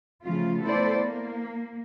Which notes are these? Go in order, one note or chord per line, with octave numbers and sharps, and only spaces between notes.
C#3 F3 A3 F4
A3 B3 E4 A4 C5 D5
A#3